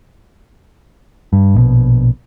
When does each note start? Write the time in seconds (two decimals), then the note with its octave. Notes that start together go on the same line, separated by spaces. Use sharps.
1.33 G2
1.54 A#1 B2